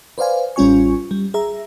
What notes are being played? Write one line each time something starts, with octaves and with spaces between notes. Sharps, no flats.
B4 C5 D5 F5 G#5
A1 G3 C#4 F4 G#5 C#6
G3
G#4 E5 A#5